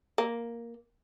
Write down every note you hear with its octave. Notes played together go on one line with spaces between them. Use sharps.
A#3